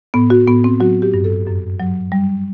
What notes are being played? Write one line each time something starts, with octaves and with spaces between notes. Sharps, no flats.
A2 B3
F#4
A2 B3
C4
F#3 F#4
G4
G2
A4
F#2
F#3
G3